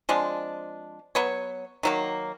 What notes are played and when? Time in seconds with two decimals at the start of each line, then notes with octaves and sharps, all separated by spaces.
0.09 F3 G#3 C4 D4
1.15 F#3 B3 C#5
1.83 D#3 F#3 A#3